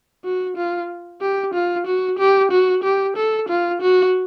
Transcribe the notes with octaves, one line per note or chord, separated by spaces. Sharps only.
F#4
F4
G4
F4
F#4
G4
F#4
G4
A4
F4
F#4